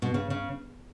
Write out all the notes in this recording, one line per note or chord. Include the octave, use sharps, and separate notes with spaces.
B2
C#3
C#3